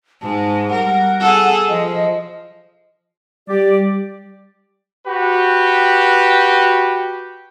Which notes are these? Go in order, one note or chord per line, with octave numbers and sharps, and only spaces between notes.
G#2 G#3 A5
G3 A#4 F#5
G#4 A4
F3 D#5
G3 G4 D5
F#4 G4 B4